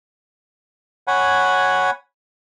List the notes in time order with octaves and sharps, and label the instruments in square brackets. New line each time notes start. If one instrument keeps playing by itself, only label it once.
[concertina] C#5 F#5 G#5 B5